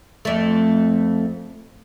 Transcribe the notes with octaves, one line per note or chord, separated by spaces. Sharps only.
F2 A3